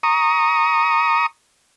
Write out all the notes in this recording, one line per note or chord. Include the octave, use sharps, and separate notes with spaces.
A#5 C#6 D#6